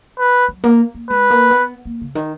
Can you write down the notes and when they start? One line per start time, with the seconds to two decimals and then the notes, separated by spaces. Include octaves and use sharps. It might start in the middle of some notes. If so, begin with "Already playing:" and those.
0.19 B4
0.48 F#3
0.64 A#3
0.95 A#3
1.10 G#3 B4
1.30 A#3
1.51 B3
1.85 A#3
2.01 C#3
2.15 D#3